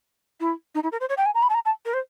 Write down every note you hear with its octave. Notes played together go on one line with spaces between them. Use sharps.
E4
D#4
E4
A#4
C5
C#5
G5
G#5
A#5
B5
A5
A#5
A5
A#4
C5